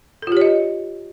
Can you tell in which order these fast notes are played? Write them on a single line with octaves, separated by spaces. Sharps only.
A4 F4 G4 C#5 D#5